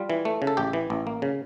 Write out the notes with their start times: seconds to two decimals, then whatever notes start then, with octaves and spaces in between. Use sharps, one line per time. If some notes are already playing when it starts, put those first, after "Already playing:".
Already playing: G3 F4
0.10 E3
0.25 A3
0.42 C#3
0.47 A4
0.57 A1 G4
0.73 E3
0.90 A1
1.07 A#3
1.22 C#3